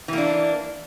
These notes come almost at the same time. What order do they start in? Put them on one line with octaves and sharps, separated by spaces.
E3 A#3 D4